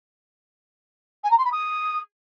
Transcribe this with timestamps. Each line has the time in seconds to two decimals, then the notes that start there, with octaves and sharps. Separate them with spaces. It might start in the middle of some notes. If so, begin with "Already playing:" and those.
1.24 G#5
1.31 A#5
1.38 C6
1.45 B5
1.52 D#6